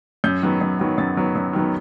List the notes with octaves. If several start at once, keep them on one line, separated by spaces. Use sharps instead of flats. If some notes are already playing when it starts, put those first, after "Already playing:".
F#2 G6
D#3 F#3 B3
F#2
D#3 F#3 B3
F#2 A6
D#3 F#3 B3
F#2
D#3 F#3 B3